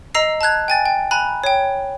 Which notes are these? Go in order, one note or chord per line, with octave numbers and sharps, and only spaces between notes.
D#5 A#5 E6 C7
A5 A#5 F#6 G#6
G5 G#5 A6
G5
G#5 A#5 B5 F#6
C#5 G5